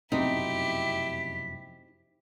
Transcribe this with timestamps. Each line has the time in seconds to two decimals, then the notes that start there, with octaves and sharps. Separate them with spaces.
0.12 F1 F#2 B2 C4 D#4 E4 G4 B6